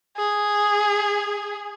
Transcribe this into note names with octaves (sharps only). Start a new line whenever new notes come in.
G#4